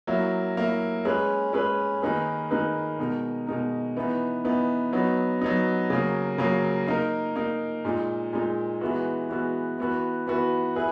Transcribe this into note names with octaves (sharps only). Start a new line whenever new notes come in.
F#3 A#3 E4
F#3 A#3 E4
G#3 C#4 G#4 B4
G#3 C#4 G#4 B4
D#3 A#3 D#4 G#4 B4
D#3 A#3 D#4 G#4 B4
B2 G#3 D#4 A#4
B2 G#3 D#4 A#4
E3 B3 D#4
E3 B3 D#4
F#3 B3 D#4
F#3 B3 D#4
C#3 F#3 A#3
C#3 F#3 A#3
A#3 D#4 A#4
A#3 D#4 A#4
A#2 G#3 D#4
A#2 G#3 D#4
E3 G#3 B3 F#4
E3 G#3 B3 F#4
E3 B3 F#4 B4
E3 B3 F#4 B4
E4 G#4 B4